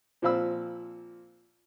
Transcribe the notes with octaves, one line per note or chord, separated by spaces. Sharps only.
A#2 F3 C4 F5 B5 E6